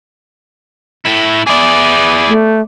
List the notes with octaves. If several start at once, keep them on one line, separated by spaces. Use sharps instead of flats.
A2 E4
B3 E4 G#4 D5
A3